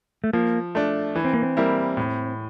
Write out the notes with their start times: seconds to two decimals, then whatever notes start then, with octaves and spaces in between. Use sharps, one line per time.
0.24 A3
0.33 F3 A#3
0.75 A3 D4
1.15 E3
1.24 C4
1.33 A#3
1.42 C4
1.57 G3 A#3 E4
1.97 A2